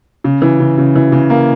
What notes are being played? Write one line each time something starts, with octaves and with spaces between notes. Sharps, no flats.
C#3
E3
C#3
C#3
E3
C#3
A#3